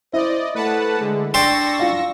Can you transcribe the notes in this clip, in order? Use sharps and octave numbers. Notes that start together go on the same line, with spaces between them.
E4 C5 D5 D#5
A3 B4 F#5 A5
D3 G#3
D4 D5 G5 C6 C#6 E6 A#6
F4 F5